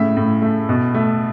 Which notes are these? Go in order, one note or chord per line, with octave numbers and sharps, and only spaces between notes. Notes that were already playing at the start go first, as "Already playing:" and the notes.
Already playing: A2 C#3 E5
A2
A3
B2
A3